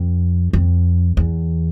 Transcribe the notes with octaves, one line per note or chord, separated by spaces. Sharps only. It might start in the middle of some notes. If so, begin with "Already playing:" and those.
Already playing: F2
F2
E2